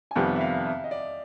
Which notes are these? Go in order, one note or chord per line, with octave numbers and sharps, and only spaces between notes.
G#5
F2 C3 D#3 G3 B3 G5
E5
F5
E5
D#5
D5